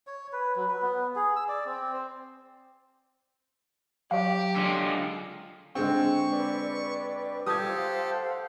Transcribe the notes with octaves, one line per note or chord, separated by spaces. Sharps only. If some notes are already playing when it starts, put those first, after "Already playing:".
C#5
B4
F#3
B4
B3
G#4
E6
D5
C4
C5
F#3 G4 C#5 F5
D3 G#3 F4
D3 G#3 C4 C#6
B4 D5
G3 F4 G4 A4 D#6 G#6
C5 F5 F#5